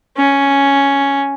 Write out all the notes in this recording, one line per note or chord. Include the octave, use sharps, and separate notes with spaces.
C#4